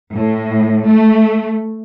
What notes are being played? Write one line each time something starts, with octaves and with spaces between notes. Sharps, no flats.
A2
A3